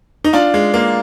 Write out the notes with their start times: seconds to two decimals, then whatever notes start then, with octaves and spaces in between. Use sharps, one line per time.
0.24 D#4
0.33 D4 F4
0.54 G#3
0.74 A#3